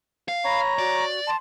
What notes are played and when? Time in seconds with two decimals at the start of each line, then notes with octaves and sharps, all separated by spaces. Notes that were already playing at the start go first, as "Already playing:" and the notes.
0.28 F5
0.45 C#5 A#5 B5
0.79 F#4 D5
1.27 A5 C6